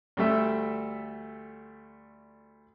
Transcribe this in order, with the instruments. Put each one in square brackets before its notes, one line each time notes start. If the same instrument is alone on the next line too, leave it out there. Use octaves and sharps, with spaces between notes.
[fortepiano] D2 G3 A3 E5